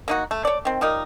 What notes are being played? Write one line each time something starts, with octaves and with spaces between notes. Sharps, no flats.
A#3 D#4 F#4
A3
C#5 D5
D#3 C4
F3 G3 D#4 A#4